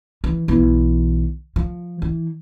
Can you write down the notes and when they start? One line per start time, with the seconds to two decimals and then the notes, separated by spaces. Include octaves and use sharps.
0.24 E3
0.48 B1 E3
1.56 F3
2.02 E3